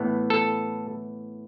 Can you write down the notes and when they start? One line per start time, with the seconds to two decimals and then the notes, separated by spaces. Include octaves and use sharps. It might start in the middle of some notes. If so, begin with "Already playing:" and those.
Already playing: A2 E3 B3
0.30 A4